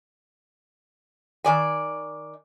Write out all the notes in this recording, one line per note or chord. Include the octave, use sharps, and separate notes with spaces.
D#3 D5 G#5